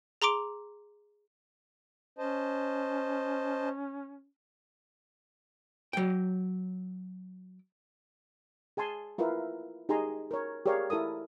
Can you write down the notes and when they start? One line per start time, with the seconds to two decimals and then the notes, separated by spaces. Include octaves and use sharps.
0.22 G#4 A#5 C6 D6 D7
2.18 C#4 C5 D#5 A5
5.93 F#3 G5
8.77 G#4 G#5 A5 C6
9.18 E4 F4 A#4 B4 E5
9.89 D#4 G4 G#4 G#5 A#5 C6
10.31 A#4 C#5
10.66 G4 G#4 A#4 C#5 D5 F5
10.90 E4 A4 A#4 D#6